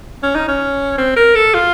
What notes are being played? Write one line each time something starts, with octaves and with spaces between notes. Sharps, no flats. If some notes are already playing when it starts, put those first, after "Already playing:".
C#4
D#4
C#4
C4
A#4
A4
F4